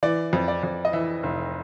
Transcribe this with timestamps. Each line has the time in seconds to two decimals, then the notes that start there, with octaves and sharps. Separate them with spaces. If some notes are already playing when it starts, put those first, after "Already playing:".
0.03 E3 D5
0.33 F2
0.48 D5
0.63 F2
0.85 D#5
0.93 E3 E5
1.23 F1